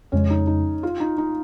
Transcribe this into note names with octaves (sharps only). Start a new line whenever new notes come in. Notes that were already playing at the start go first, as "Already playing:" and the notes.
F2 C#3 G#3 C#4
D#4
D#4
F4
D#4
D#4